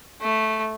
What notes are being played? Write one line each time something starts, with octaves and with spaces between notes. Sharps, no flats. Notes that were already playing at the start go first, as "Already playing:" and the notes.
A3